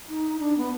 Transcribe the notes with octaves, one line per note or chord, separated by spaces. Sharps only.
D#4
D4
B3